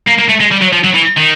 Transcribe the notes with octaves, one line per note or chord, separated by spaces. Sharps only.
A#3
A#3
A3
G#3
G3
F#3
F3
F#3
E3
D#3